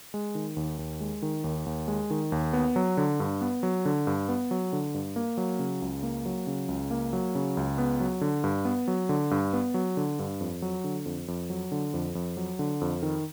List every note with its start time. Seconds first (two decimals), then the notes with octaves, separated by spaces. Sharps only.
0.14 G#3
0.35 D#3
0.57 D#2
0.79 D#2
1.00 G#3
1.22 D#3
1.44 D#2
1.66 D#2
1.88 G#3
2.10 D#3
2.32 D#2
2.53 B3
2.76 F#3
2.97 D3
3.20 G2
3.41 B3
3.63 F#3
3.85 D3
4.07 G2
4.29 B3
4.51 F#3
4.73 D3
4.94 G2
5.16 A#3
5.37 F#3
5.59 C#3
5.82 C#2
6.03 A#3
6.26 F#3
6.47 C#3
6.69 C#2
6.91 A#3
7.13 F#3
7.35 C#3
7.57 C#2
7.78 B3
8.00 F#3
8.21 D3
8.44 G2
8.65 B3
8.88 F#3
9.09 D3
9.31 G2
9.53 B3
9.74 F#3
9.97 D3
10.19 G2
10.41 F2
10.62 F#3
10.84 D3
11.06 F2
11.28 F2
11.50 F#3
11.72 D3
11.94 F2
12.15 F2
12.37 F#3
12.59 D3
12.81 F2
13.02 D#3